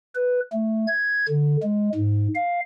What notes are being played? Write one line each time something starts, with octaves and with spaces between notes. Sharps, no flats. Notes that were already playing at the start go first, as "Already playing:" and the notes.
B4
A3
G#6
D3
G#3
G#2
F5